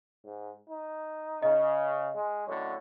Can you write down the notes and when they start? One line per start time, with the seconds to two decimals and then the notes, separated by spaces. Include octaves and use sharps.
0.24 G#2
0.70 D#4
1.42 C#3 D#5
2.15 G#3
2.47 F#2 A2 D3 C#5